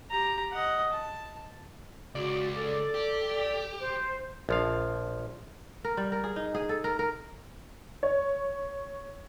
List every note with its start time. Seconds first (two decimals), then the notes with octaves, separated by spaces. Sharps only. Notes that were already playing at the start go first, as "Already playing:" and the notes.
0.11 G4 A#5
0.52 D#5 F#5
0.92 A5
2.15 C#2 F#4 D5
2.55 A4
2.94 G4
3.80 C5
4.49 A#1 F3 F5
5.84 A#4
5.97 G3
6.12 A#4
6.24 G#4
6.36 D#4
6.55 G#4
6.69 A4
6.84 A#4
6.99 A#4
8.03 C#5